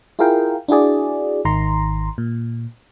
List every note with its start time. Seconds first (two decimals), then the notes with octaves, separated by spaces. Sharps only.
0.19 E4 F4 G#4 A#4 F5 G5
0.68 D4 E4 F#4 G#4 D5
1.45 G#1 D#3 A#5 C6
2.18 A#2